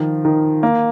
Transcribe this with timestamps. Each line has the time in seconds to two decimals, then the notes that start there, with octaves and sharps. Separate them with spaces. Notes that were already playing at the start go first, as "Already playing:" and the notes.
Already playing: D#3 F3
0.25 D#3
0.63 A#3